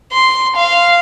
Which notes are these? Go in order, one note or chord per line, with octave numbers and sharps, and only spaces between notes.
C6
F5